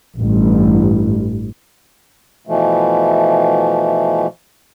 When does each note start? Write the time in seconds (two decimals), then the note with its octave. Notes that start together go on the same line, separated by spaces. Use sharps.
0.17 A1 G2
2.47 B2 E3 F3 A3